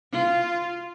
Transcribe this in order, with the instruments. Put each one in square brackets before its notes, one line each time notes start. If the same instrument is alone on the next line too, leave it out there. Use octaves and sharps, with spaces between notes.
[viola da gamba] F4